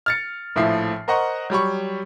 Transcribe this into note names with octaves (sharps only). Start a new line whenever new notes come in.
F6 A6 C#7
A#1 A2 F3 E4 C7
A#4 C5 D#5 F#5 A#5 C#6
F#3 G3 B5 C#6